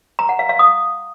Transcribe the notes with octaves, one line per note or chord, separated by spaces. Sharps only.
A#5
F#5
F5
F5
D#6